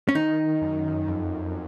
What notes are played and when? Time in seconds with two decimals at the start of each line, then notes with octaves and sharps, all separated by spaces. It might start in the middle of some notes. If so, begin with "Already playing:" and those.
0.09 C#4
0.15 D#3 D#4
0.62 F#2
1.08 F2